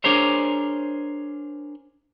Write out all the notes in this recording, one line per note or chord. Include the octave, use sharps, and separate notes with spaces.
D4 G#4 A#4 C5 C#5